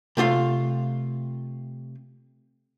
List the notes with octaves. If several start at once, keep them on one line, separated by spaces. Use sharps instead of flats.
C3 A3 F4 F5